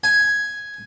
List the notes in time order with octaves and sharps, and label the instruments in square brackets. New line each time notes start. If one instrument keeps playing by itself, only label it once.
[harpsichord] G#5